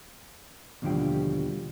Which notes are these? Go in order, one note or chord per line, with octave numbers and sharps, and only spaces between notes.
D#2 B2 D3 F3 G3 G5